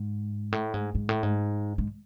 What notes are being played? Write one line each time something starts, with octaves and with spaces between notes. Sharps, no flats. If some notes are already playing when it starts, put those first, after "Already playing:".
Already playing: G#2
A2
G#2
G#2
A2
G#2
G#2